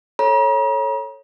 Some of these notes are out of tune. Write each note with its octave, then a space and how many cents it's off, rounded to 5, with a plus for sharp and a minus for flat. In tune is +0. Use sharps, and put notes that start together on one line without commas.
A4 +0 C#5 -15 A#5 +45